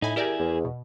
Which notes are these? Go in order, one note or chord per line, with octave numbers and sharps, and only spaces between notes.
A2 D#4 E4 G#5
E4 G4 G#4 A#4 D5
E2
B2